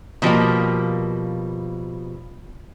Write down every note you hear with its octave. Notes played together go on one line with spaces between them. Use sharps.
B2 F3 G3 A#3